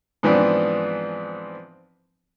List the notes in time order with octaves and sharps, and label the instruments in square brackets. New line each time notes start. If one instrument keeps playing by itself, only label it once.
[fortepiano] G#2 E3 F3 B3 C4 D4